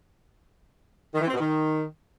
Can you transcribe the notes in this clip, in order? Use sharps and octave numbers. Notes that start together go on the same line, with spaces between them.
D#3
E3
C4
B2
D#3